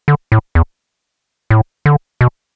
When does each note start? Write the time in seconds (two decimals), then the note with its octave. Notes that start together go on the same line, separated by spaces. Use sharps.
0.08 D3
0.32 A2
0.55 E2
1.50 A2
1.86 D3
2.21 B2